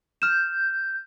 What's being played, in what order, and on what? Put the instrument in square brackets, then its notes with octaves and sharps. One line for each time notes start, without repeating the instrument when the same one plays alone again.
[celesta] F6 E7 [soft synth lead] G6